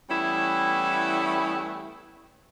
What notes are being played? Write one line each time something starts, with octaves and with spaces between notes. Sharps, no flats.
E3 G3 A3 B3 C#4 E4